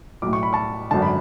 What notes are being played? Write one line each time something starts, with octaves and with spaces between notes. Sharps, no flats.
B1 A2 D6
C#6
B5
A5 C#6
G#1 F#2 D3 A5
B5